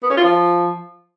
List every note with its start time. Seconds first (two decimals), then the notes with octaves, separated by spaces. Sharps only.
0.03 B3
0.10 C#4
0.17 F4
0.24 F3